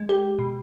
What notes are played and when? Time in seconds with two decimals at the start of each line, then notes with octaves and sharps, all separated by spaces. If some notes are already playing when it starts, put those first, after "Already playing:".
Already playing: G#3
0.09 G4
0.39 B2